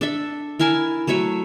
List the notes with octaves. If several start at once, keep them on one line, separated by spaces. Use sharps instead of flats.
D4 A4 E5
E4 A#4 G#5 A5
F#3 A3 C#5 E5